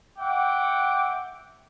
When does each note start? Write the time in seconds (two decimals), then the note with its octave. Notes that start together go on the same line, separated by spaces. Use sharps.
0.18 E5 F#5 G5 D6